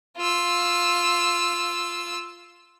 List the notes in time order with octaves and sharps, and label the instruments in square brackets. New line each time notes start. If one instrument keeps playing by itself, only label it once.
[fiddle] F4 E6